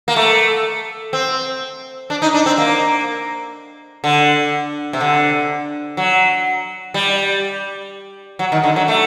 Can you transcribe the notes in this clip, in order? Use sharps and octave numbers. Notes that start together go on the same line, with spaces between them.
A#3
A3
C4
D4
D#4
D4
C4
A#3
D3
C3
D3
F#3
G3
F#3
D#3
D3
F#3
A3